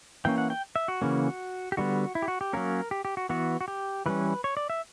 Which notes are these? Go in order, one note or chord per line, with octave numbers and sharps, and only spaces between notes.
E3 A#3 C#4 G5
F#5
G5
E5
F#4
C#3 E3 A#3 C#4
G4
D3 G3 B3 F#4
E4
G4
F#4
G4
F#3 A#3 C#4 A#4
G4
G4
F#4
E3 B3 F#4
F#4
G4
E3 G3 C#4 B4
C#5
D5
E5